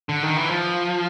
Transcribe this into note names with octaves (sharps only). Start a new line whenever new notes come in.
D3
D#3
E3
F3